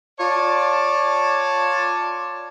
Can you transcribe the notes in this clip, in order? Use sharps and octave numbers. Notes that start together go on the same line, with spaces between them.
F4 C#5 D5 A5